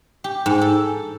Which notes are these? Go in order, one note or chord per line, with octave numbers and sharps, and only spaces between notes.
G4
G#2
A4